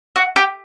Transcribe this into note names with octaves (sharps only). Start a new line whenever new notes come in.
F#4
G4